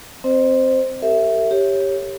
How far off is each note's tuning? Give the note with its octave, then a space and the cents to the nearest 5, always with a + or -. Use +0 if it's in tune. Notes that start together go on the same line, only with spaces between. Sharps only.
C4 +0 C5 +0 D#5 -30
G4 +0 A#4 -40 E5 +0
G4 +5 C#5 -10